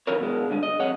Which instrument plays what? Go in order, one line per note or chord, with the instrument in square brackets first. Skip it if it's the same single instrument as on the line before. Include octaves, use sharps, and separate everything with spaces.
[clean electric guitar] D#3 E3 F#3 E4 A#4 C#5
B2 G#3
G2 D3 G#3
D#5
F2 C#5 F#5